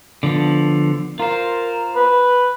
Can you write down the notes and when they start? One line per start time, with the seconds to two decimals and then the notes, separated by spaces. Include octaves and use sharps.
0.23 D3 F3 B3
1.20 F4 A#4 C5
1.96 B4